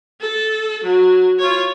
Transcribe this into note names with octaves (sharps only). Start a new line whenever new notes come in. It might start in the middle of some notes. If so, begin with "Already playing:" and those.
A4
F#3
F4 C#5